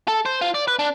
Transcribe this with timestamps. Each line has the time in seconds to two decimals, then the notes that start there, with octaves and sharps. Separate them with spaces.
0.08 A4
0.26 C5
0.41 F4
0.54 D5
0.68 B4
0.79 D4